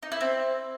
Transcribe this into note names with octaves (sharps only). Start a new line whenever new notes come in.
D#4
E4
C4